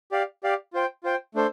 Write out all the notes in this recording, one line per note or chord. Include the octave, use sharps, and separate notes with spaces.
G4 D5 F5
G4 D5 F5
F4 C5 G5
F4 C5 G5
A3 D4 A4 C5